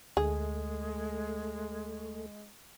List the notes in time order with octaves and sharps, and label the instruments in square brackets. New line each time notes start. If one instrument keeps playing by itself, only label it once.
[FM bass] D2 [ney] G#3 [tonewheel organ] A3 [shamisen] G#4